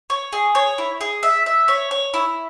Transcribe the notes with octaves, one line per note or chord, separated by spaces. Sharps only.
C#5
G#4
C#5
E4
G#4
E5
E5
C#5
C#5
E4